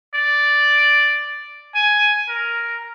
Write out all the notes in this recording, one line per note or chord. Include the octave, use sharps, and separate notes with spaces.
D5
G#5
A#4